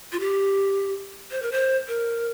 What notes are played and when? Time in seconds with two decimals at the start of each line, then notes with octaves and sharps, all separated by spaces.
0.12 F4
0.20 G4
1.31 C5
1.42 A#4
1.52 C5
1.88 A#4